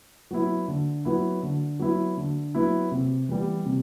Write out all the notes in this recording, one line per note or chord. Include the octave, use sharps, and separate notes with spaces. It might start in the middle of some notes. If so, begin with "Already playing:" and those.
F#3 B3 E4
D3
F#3 B3 E4
D3
F#3 B3 E4
D3
F#3 B3 E4
C3
E3 G3 B3
C3